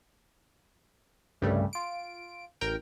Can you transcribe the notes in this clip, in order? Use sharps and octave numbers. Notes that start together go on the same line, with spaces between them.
C2 G2 C#3 G3 A3
F4 D7
A1 A#4 G5